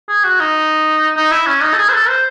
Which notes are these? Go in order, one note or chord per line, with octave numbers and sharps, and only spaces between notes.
G#4
F#4
D#4
D#4
E4
C#4
D#4
A4
G#4
C5
A4
C5